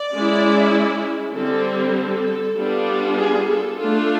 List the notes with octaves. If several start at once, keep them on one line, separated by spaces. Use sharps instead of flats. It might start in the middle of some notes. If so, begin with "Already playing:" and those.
Already playing: D5
G#3 C#4 E4
D3 G3 C4 A4
A4
G3 B3 D4 F4
G#4
A4
A3 D4 F4 A4